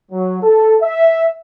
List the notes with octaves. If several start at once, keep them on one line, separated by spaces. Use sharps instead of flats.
F#3
A4
E5